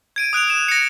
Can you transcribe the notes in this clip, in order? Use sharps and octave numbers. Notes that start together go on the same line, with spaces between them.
G#6 D7 D#7
D#6 F#6 D7 F7
E7
A#6 C#7